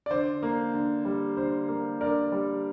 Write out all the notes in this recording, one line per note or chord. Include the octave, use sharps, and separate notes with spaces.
D5
D3 C5
A#3
D3
G3
D3 C5
A#3
D3 A#4 D5
G3